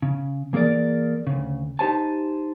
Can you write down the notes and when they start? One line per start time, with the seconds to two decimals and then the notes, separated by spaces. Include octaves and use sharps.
0.02 C#3
0.53 E3 A#3 G#4 A#4 D5
1.27 D2 C#3
1.79 D#4 F#4 G4 C5 G#5 A5